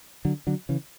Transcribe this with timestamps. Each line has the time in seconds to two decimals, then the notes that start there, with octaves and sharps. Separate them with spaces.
0.25 D3 F#3
0.47 D3 F#3
0.69 C#3 E3